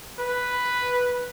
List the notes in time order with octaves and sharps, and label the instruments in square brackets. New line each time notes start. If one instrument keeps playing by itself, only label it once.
[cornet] B4